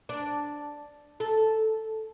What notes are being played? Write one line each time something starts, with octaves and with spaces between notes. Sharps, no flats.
D4
A4